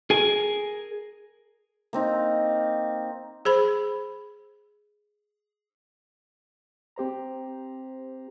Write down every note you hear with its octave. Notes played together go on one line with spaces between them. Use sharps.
G#4 A#4 G#5
A#3 C4 D#4
G#4 C5 B5
C4 G4 C5 A#5